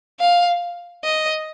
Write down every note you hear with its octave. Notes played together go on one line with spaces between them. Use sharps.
F5
D#5